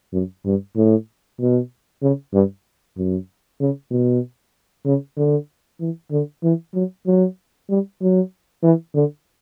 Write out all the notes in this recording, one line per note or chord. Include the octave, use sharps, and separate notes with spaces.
F#2
G2
A2
B2
C#3
G2
F#2
C#3
B2
C#3
D3
E3
D3
E3
F#3
F#3
G3
F#3
E3
D3